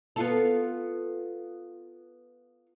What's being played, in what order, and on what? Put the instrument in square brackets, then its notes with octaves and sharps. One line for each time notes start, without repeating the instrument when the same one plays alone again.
[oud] B3 F4 A4